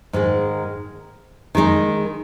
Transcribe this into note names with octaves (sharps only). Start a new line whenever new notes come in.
G#2 D#3 G#3
D#3 G#3 D#4